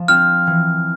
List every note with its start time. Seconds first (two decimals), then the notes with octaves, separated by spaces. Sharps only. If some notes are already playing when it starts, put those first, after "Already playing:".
Already playing: F3
0.08 C4 F4 F6
0.47 E3